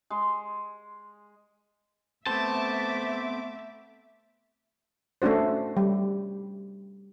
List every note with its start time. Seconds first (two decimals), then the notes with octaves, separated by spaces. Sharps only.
0.10 G#3 C6
2.26 A3 B3 C4 C5 E5 A5 D6
5.22 A3 C#4 D4 F#4 C5
5.77 G3